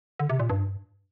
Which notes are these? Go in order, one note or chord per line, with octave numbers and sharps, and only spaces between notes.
D3
C3
A#2
G2